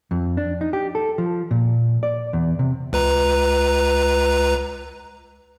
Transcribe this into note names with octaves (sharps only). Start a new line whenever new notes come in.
F2
D4
D#4
G4
A4
F3
A#2
D5
E2
C3
C#2 B4 A#5